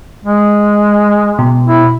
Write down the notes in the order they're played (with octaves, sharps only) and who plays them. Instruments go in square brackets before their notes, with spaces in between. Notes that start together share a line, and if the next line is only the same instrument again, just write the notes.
[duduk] G#3
[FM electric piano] B2
[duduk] E4